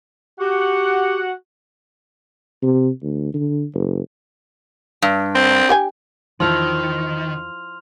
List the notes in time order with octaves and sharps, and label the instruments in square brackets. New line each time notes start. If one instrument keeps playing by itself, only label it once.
[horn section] F#4 F#5 [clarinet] G4
[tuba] C3
D2
D3
F#1
[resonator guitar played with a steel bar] G2
[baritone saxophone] C4
[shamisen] G4 G5 G#5
[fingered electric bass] E2 [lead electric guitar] D#3 [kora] F3 E4 F4 [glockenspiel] C6 F6 F7